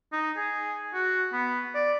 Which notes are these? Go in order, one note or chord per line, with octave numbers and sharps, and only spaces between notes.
D#4
G#4
F#4
B3
D5